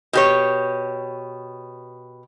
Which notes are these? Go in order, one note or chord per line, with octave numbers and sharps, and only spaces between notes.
B2 G4 C#5